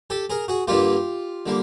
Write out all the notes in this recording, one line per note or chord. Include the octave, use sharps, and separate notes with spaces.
G4 A4
G#4 A#4
F#4 G#4
G2 D3 G3 A#3 F4 G4
D3 G3 A#3